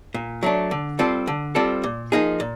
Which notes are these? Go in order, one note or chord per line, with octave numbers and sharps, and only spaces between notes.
A#2
F#3 A3 D4
D3
G3 C4 F4 A4
D3
G3 C4 F4 A4
A#2
F3 A#3 D#4 G#4
A#2